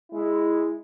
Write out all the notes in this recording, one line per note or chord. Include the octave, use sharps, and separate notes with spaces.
G#3 E4